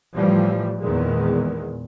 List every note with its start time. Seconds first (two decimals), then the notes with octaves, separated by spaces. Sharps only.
0.15 A2 E3 F3 G3
0.81 E2 A#2 D#3 G#3